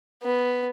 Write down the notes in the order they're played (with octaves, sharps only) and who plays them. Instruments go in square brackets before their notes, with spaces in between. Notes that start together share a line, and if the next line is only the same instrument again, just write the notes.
[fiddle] B3